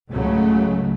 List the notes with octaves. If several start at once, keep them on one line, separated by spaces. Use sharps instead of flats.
C#2 G#2 C#3 F#3 A3